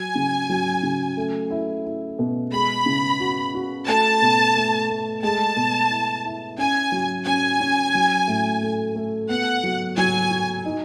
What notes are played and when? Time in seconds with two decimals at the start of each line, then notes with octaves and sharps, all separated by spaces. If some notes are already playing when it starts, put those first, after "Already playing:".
Already playing: F#3 G#5
0.15 C#3
0.50 F#3
0.83 C#3
1.17 A3
1.51 E4
1.85 E4
2.19 B2
2.52 G#3 B5
2.86 C#3
3.20 F#4
3.54 F#4
3.87 A3 A5
4.22 B2
4.56 A3
4.90 A3
5.23 G#3 A5
5.56 B2
5.90 E4
6.25 E4
6.58 C#4 G#5
6.92 F#3
7.26 C#4 G#5
7.60 C#4
7.95 F#3
8.27 A2
8.62 A3
8.96 A3
9.29 B3 F#5
9.63 F#3
9.97 F#3 G#5
10.31 F#4
10.65 D#4